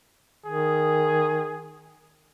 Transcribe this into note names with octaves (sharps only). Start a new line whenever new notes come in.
D#3 G#4